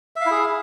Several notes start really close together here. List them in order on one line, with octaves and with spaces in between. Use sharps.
E5 F5 E4 G#4